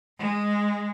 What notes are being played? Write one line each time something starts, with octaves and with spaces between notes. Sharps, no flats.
G#3